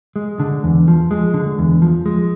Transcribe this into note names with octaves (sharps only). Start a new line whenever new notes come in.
G#3
D3
E2
F3
G#3
D3
E2
F3
G#3